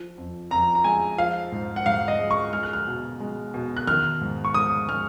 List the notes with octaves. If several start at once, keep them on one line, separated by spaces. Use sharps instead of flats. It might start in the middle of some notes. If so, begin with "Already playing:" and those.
Already playing: F3
F2
F2 A#5
A#5
G#3 G#5
F3 F5
G#2
F#5
G#2 F5
D#5
G#3
C#6
G#3 F6
F#6
F6
B2
G#3
B2
F#6
D#3 F6
G#2
C#6
G#2 D#6
G#3 F6